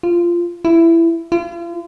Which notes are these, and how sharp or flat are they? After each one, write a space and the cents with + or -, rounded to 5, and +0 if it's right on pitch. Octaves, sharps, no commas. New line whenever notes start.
F4 -15
E4 +15
F4 -40